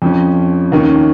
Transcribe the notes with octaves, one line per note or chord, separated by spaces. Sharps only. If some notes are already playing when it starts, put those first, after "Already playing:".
F2 F3 C#4
D#2 D#3 C#4